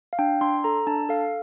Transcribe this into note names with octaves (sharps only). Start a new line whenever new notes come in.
F5
D4 G5
D4 C6
A4 A#5
D4 A5
A4 F5